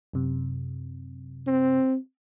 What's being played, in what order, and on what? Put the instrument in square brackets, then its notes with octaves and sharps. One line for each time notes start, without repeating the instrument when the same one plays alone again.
[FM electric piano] F#2 C3
[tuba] C4